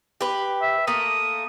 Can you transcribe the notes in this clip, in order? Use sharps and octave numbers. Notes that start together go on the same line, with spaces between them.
G4 B4
E5
A3 A#3 D#6